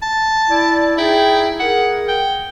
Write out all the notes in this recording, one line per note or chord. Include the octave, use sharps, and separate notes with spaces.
A5
E4 D5
D#4 E4 G#4 G5
G#4 A#4 F#5
G5